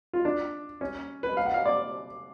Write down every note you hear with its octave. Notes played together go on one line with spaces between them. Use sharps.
F4
D4
C#4
B4
F5
F#5
F5
D5